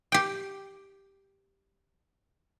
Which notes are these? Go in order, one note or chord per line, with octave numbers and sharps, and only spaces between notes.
G4 G5